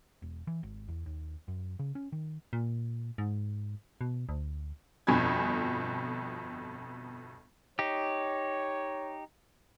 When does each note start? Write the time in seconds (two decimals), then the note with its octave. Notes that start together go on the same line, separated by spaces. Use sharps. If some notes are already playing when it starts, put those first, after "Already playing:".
0.22 E1
0.47 E3
0.63 G#1
0.88 E2
1.06 D#2
1.48 F#2
1.79 C#3
1.95 C#4
2.12 D#3
2.53 A#2
3.18 G#2
4.01 B2
4.29 D2
5.07 G1 F2 B2 G#5 B5 G#6
7.79 D#4 G4 C#5